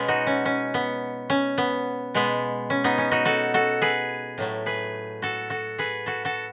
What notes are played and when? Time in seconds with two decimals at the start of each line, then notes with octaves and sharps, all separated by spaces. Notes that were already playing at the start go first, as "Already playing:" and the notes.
Already playing: B2 G#3 B3 C#4
0.08 D#4 F#4
0.27 C#4
0.46 C#4
0.74 B3
1.30 C#4
1.58 B3
2.14 B2 G#3 B3
2.70 C#4
2.84 B3 D#4
2.98 C#4
3.11 D#4 F#4
3.25 F#4 A4
3.54 F#4 A4
3.82 G#4 B4
4.38 A2 F#3 A3
4.66 G#4 B4
5.22 F#4 A4
5.50 F#4 A4
5.79 G#4 B4
6.06 F#4 A4
6.25 F#4 A4